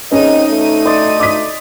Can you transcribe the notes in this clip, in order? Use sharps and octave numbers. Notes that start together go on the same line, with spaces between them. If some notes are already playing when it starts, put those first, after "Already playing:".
D#2 C4 C#4 D#4 G#4 B4 D#5 D#7
D2 A3
D5 D#5 C6
D6 D#6 B6